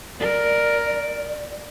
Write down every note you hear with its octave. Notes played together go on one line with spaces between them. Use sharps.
A#4 D5